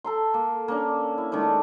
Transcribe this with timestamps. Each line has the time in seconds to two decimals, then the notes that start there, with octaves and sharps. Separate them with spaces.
0.04 A4 A#5 C6
0.34 A#3
0.68 A#3 C#4 D4
1.18 E4
1.32 D#3 G#3 A3 D4